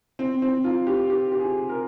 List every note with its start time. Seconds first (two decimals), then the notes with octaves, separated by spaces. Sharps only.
0.19 C4
0.42 C4
0.64 F4
0.87 G4
1.10 G4
1.32 G4
1.40 G#4
1.69 A#4